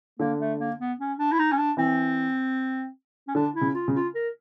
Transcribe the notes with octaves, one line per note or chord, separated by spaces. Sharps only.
D3 A#3
A3
A#3
B3
C#4
D4
E4
D#4
C#4
D4
E3 C4
C#4
D3 D4
E4
C#3
F4
C#3
F4
A#4